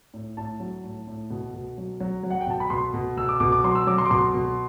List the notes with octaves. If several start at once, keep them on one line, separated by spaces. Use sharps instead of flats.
A2
A2 A5
F#3
A2
A2
B2
B2
F#3
F#3
F#3
F#5
G5
B2 A5
B5
B2 C6
B2
B2 E6
D6
B2 D6
D6
F#3 C6
E6
F#3 D6
C6
D6
B2 C6
B2